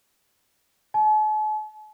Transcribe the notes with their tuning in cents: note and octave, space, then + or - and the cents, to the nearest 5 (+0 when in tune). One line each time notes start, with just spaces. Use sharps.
A5 -45